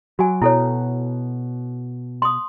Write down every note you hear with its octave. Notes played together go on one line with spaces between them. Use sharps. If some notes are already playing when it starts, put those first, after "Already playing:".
F#3 F#4 G#5
B2 E4 A4 C#5
C6 D#6